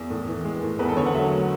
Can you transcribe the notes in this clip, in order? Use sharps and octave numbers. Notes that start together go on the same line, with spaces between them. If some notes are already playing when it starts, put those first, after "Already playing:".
Already playing: E2
A2
E3
G#3
A2
E2 B4
A4
D3 C#5
F#5
F#3 E5
A3